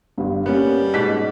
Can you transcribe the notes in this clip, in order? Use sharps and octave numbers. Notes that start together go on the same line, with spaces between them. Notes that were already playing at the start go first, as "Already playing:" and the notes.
G1 G2
G3 A#3 B3 C#4
G#2 B2 D5 B6